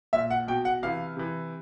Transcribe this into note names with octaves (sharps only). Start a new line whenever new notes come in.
A#2 E5
F#5
B2 G5
F#5
C3 E3 F5
C3 E3